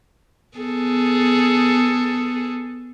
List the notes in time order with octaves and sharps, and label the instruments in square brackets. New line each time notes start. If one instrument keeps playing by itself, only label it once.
[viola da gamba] B3 G#4 A4